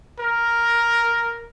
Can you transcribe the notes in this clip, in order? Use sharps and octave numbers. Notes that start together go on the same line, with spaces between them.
A#4